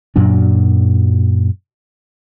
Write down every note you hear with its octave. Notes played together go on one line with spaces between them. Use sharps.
F#2 A#2 F#3 D4